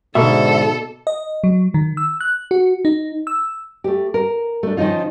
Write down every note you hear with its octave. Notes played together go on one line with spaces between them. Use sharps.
G#2 B2 D3 A#3 A4 E5
D#5
F#3
D#3
E6
F#6
F#4
D#4
E6
A3 G4
A#4
A3 D4
D#3 F3 C#4 D#4 F4